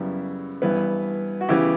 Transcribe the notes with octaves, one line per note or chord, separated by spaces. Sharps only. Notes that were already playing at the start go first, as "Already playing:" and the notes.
Already playing: F#2 C#3 G3 B3 E4
G2 E3 B3
F#4
C#3 E3 B3 E4 G4